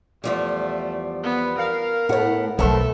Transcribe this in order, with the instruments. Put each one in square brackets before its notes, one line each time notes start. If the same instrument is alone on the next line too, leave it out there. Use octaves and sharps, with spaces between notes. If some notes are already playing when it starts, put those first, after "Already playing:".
[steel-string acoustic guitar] E2 F3 G3 [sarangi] A3
[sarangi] B3
[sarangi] A#4 [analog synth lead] F5
[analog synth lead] A2 [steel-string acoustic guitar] B3 F#5
[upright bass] B1 F#3 [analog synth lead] A3 [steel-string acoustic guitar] B3 A#4 C5 [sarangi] A4